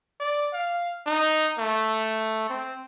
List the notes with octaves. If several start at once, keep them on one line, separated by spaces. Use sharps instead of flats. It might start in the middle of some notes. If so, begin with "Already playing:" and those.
D5
F5
D#4
A3
C4